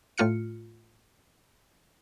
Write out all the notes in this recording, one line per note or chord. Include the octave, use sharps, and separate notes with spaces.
A2 A3 F4 F6 C#7